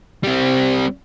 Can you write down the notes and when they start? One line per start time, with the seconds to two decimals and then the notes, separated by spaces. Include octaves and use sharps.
0.23 G3 C4